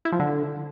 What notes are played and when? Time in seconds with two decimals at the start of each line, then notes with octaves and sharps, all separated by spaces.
0.05 E4
0.12 F3
0.20 D3